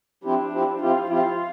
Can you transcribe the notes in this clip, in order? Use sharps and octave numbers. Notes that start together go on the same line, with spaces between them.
F3 C4 D4 E4 G4
F3 C4 E4 G4
F3 C4 E4 F4 G4
F3 C4 E4 F4 G4